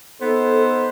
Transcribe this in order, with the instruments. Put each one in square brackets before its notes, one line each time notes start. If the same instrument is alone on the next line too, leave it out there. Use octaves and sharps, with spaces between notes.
[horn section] B3 D#4 C5 [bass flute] A4